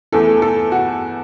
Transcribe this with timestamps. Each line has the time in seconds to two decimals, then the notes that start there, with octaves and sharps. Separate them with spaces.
0.12 E2 E3 A3 A4
0.42 A4
0.72 F#4